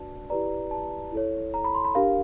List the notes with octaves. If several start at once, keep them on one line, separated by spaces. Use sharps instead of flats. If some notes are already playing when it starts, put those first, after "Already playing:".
Already playing: D4 F#4 B4 D5 A5
E4 G4 B4 D5 A#5
A5
E4 A4 C#5
A#5
B5
C6
B5
D4 G4 A#4 F5